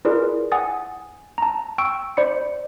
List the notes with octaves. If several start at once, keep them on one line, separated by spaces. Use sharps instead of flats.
E4 F4 G#4 A#4 B4 D5
F#5 G#5 D#6 A6
A5 A#5
G5 C#6 E6 D7
C5 D5 B5 C#7